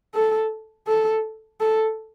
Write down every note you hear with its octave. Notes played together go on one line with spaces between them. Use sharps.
A4
A4
A4